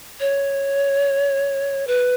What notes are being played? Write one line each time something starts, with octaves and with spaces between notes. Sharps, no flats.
C#5
B4